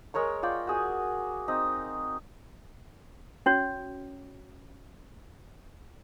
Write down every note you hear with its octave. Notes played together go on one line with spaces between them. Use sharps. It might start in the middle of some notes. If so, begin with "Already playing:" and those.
G#3 A#4 C#5 C#6
F4 D5 G5
F#4 G#4 G#5
C4 D#4
C#4 F#4 C#5